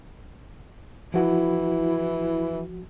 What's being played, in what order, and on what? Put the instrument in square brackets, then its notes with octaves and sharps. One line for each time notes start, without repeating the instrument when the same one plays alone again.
[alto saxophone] E3 [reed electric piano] F3 F#4 [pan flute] E4